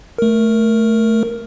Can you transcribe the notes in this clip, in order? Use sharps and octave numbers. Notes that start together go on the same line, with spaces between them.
A3 A#4